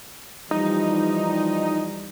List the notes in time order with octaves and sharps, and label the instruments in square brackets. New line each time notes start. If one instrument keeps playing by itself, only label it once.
[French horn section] E3 F3 G3 [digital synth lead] D#4